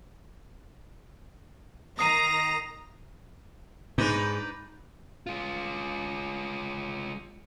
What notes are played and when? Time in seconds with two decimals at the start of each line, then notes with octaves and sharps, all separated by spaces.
1.99 D#3 A#5 D#6 A#6 C7 D#7
3.98 G#2 D4 D#4 B4
5.27 G#3 F4